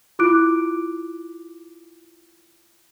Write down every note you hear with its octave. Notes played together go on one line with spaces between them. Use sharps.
E4 F4 D6 F#6 D7